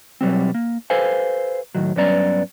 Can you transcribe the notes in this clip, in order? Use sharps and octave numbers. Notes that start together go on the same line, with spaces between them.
B2 F#3 G3 C4
A#3
G4 A4 B4 C5 F5 G#5
A2 D#3 F#3
G2 F#3 B3 C#4 D5 A#5